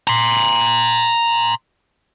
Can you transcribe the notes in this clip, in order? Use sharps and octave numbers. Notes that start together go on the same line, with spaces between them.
A#5 C6